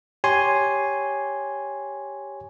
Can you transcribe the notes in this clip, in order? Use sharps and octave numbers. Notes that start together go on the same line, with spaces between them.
G4 C#5 G#5 C6